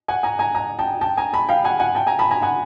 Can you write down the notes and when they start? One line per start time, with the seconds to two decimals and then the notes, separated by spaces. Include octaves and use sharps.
0.08 F#5 G#5
0.23 G#5 A#5
0.39 G#5 A#5
0.55 G#5 A#5
0.79 G5 A5
1.01 G5 A5
1.17 G#5 A#5
1.33 A5 B5
1.49 F5 G5
1.64 F#5 G#5
1.79 F#5 G#5
1.95 G5 A5
2.07 G#5 A#5
2.19 A5 B5
2.31 G#5 A#5
2.42 F#5 G#5